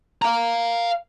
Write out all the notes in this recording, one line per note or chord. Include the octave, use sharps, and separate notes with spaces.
F5 A#5